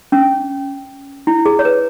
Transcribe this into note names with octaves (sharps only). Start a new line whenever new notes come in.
C#4
E4
G#4
C#5
B4